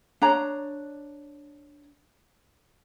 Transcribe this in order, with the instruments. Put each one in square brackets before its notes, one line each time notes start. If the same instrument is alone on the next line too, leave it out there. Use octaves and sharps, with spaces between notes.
[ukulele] D4 C#5 A#5